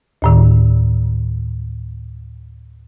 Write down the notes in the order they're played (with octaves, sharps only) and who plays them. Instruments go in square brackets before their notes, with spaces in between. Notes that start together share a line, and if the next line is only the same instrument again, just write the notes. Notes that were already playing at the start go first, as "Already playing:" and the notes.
[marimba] D2 A2 D#3